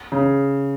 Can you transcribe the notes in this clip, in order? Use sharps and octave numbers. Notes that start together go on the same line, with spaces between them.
C#3